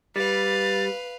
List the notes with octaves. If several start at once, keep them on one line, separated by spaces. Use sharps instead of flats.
G3 B4 F5 A6